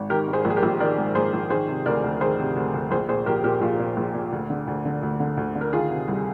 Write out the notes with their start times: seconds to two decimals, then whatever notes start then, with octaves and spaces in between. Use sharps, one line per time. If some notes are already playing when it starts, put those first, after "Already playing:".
Already playing: G#1
0.10 D#3 G4 A#4
0.28 G#2
0.33 G#4 C5
0.45 A#1
0.50 G#4
0.57 G4 A#4
0.63 A#1
0.80 D#3 A#4 D5
0.98 G#2
1.15 A#1 G#4 C5
1.33 A#1
1.50 D#3 G#4 C5
1.68 C3
1.86 D2 A#4 D5
2.04 D2
2.21 D#3 G#4 C5
2.39 C3
2.56 D2
2.74 D2
2.91 A#1 G#4 C5
3.09 A#2 G#4 C5
3.26 A#1 G4 A#4
3.44 A#2 G4 A#4
3.61 A#1 F4 G#4
3.79 A#2
3.97 A#1
4.14 A#2
4.32 D2
4.50 D3
4.67 D2
4.85 D3
5.03 D2
5.20 D3
5.37 D2
5.55 D3
5.61 A#4
5.73 D#3 F4 G#4
5.90 C3
6.08 C2